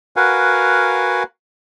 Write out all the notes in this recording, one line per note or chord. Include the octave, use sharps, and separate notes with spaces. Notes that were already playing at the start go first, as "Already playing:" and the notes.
F#4 A#4 B4 F5 F#5 G#5